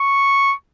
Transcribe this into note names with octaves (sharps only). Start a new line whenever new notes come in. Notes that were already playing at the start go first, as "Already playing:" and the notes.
Already playing: C#6